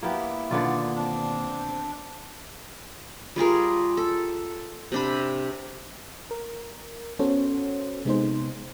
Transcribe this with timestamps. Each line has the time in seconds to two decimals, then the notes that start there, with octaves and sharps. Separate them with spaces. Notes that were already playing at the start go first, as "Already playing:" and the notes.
0.03 A#3 B3 E4 G4
0.51 B2 D3 D#3 A#3 B3 F4 D5
0.96 C4 D4
3.36 G3 F4 G#4 A#4
3.97 A4
4.92 C3 D4 B5
6.31 A#4
7.19 B3 C#4 F#4 A4 C5 C#5
8.05 C3 G#3 B3 D#4 G#4 C5